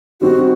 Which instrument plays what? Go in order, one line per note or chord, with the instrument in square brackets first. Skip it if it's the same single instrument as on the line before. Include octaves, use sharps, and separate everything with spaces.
[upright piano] D#3 G3 C4 D#4 [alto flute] F#4